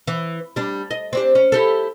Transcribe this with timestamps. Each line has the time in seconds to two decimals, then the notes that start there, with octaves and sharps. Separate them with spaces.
0.07 E3
0.56 G3 D4
0.91 D#5
1.13 C4 D4 G4
1.35 C#4
1.52 E4 G4 A4